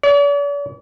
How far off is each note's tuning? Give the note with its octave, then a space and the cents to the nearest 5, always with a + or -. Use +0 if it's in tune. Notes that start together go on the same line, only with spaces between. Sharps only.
D5 -45